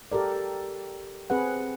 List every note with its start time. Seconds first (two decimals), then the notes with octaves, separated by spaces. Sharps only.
0.12 G4 A4 A#4 D5
1.30 C4 G#4 B4 F#5